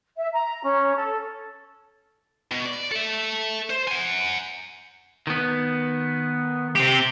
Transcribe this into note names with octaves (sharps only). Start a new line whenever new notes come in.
E5
A#5
C#4
A4
B2
D5
A4 E5
C5
F#5 G#5
D#3 B3
C3 G4